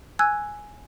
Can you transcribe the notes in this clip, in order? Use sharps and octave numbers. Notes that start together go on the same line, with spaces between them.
G#5 E6 F#6 G#6